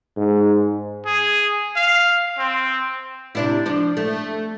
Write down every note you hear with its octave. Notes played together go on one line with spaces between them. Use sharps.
G#2
G#4
F5
C4
C3 D4 E4
F3 D4
A3